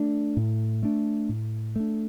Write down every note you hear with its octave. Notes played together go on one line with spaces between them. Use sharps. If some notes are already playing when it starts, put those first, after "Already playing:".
Already playing: A3 D4
A2
A3 D4
A2
A3 D4